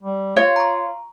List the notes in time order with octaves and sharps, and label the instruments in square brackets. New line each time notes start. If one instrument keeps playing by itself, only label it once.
[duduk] G3
[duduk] F4 [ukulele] C#5 [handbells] F5
[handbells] A#5 C#6